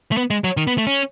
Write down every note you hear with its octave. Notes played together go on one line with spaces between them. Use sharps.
A3
B3
G#3
F#3
D#3
B3
A3
C#4